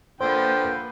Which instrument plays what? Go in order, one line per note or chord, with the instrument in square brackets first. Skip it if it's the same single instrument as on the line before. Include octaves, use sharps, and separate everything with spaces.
[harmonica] D3 F3 G5 [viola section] A#3 B4 [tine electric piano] C5